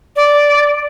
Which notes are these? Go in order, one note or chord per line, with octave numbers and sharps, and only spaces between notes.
D5